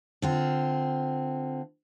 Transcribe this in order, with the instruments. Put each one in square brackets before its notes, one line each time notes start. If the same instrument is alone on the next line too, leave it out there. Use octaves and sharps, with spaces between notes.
[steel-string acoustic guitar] D3 C4 F4